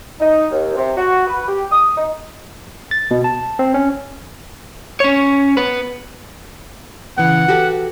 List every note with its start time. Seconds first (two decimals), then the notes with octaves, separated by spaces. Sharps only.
0.20 D#4
0.51 D#2
0.76 C3
0.96 F#4
1.27 B4
1.48 G4
1.71 D#6
1.96 D#4
2.91 A6
3.11 B2
3.24 A5
3.59 C4
3.74 C#4
5.00 C#4 C#5
5.57 B3 B4
7.18 C#3 E3 B3 F#5
7.48 F#4 G4 A4